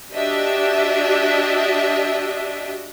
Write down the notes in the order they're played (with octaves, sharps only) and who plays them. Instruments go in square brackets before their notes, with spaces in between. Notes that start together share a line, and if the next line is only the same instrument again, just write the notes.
[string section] D4 F#4 G4 D#5 E5